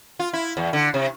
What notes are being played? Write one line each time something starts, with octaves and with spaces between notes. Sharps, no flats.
F4
E4
E2
D3
C3